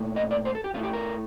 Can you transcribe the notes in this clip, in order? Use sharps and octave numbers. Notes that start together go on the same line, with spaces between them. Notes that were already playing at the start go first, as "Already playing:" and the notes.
Already playing: A#2 A3
D#5
D5
C5
A4
G4
A2 A3 F4
G4
A#4